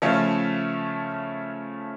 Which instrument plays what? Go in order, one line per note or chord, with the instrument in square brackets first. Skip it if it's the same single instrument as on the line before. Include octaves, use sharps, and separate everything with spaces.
[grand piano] C#3 F3 A3 C#4 F4